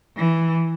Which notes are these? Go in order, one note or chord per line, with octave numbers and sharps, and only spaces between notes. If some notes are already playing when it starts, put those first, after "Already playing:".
E3